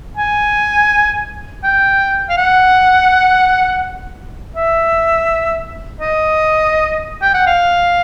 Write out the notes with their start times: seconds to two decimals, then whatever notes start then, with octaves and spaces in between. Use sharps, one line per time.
0.17 G#5
1.64 G5
2.29 F5
2.37 F#5
4.56 E5
6.01 D#5
7.22 G5
7.34 F#5
7.47 F5